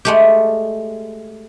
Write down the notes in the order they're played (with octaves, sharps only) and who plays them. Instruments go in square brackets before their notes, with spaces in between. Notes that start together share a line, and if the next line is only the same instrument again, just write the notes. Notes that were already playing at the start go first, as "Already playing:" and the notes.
[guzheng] G#3 A3 G4